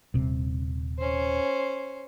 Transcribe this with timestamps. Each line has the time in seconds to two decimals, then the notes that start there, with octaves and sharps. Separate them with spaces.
0.14 D#1 C3
0.98 C#4 C5